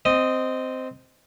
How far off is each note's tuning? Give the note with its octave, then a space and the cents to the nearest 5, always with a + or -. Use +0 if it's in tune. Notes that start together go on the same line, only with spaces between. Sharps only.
C4 -10 D#5 +0